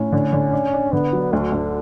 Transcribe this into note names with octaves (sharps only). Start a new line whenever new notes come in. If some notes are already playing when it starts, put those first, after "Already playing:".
Already playing: A2 C#4
D3
D3
D4
D4
D3 B3
F#3
D2 D3
D2